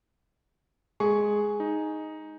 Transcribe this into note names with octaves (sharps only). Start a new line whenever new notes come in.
G#3 G#4 C#6
D#4